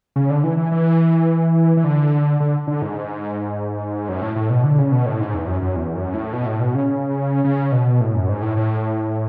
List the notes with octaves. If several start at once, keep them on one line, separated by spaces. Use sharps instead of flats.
C#3
D3
E3
E3
E3
E3
D3
D3
D3
G#2
F#2
A2
A2
B2
D3
C#3
B2
A2
G#2
E2
F#2
F#2
E2
F#2
A2
B2
A2
B2
C#3
C#3
B2
A2
F#2
G#2
A2
A2